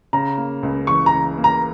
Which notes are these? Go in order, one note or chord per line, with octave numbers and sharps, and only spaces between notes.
C#3 A#5
A#3
C#2
E3 C#6
A#5
C#3
A#3
A#5